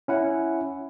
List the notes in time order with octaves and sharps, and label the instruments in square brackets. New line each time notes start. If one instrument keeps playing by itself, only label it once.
[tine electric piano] C#4 E4 F#5